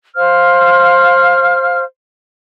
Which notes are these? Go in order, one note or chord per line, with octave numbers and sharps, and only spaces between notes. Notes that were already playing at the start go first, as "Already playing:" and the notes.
C5 F5 F6